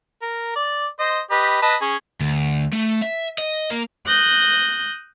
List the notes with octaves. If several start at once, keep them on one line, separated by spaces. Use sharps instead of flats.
A#4
D5
C5 D#5
G4 B4 D#5
B4 D#5 A5
C#4 G#4
D2
A3
E5
D#5
A#3
D#6 F#6 G6 A#6